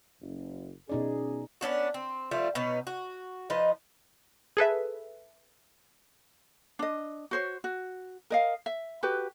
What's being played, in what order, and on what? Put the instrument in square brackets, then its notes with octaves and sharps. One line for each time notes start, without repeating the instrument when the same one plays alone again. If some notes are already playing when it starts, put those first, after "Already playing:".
[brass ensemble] F#1 F#2
[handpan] B2 D#4 D5 [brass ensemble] C#4 G#4
[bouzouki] B3 C#4 D4 F#4
C4
F3 G3 A3 F4
B2 C#4 D#4
F#4
F3 D#4 B4 D#5
[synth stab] G#4 A4 B4 E5
[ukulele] D4 D#5
F#4 C5 C#5
F#4
A#4 D#5 F5
E5
F#4 G4 B4